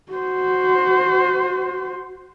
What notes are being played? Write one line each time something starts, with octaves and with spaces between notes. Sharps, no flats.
F#4 C5